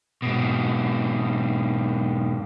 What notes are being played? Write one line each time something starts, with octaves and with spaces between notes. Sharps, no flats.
G#2 B2